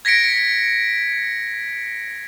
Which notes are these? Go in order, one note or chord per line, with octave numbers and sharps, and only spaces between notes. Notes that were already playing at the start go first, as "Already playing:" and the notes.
G#6 A#6 B6 C#7 D7